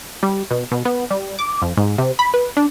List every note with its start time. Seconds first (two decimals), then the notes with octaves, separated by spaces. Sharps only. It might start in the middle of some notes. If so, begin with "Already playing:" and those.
0.23 G3
0.51 B2
0.72 B2
0.85 B3
1.11 G3
1.39 D6
1.62 F2
1.77 G#2
1.98 C3
2.19 B5
2.34 B4
2.57 D4